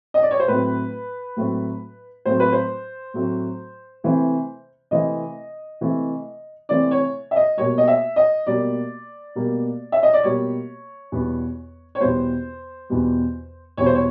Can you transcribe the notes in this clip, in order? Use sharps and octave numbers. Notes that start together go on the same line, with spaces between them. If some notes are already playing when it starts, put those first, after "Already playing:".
D#5
D5
C#5
C5
A2 F#3 A3 C4 B4
A2 F#3 A3 C4
A2 F#3 A3 C4 C5
B4
C5
A2 F#3 A3 C4
C3 E3 A3 C4
C3 E3 A3 C4 D#5
C3 E3 A3 C4
C3 E3 A3 C4 D5
C#5
E5
D#5
B2 G3 A#3 C#5
D#5
E5
D#5
B2 G3 A#3 D5
B2 G3 A#3
E5
D#5
D5
B2 G3 A#3 C#5
E2 B2 G3 B3
C#5
E2 B2 G3 B3 C5
E2 B2 G3 B3
E2 B2 G3 B3 C#5
C5
C#5